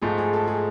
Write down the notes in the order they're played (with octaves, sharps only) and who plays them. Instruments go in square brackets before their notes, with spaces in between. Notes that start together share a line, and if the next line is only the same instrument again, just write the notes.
[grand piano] G#2 F3 A3 [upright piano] G#4
[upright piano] G#4
A4
G#4